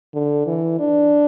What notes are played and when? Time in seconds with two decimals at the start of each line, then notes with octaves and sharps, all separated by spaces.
0.14 D3
0.47 E3
0.79 D4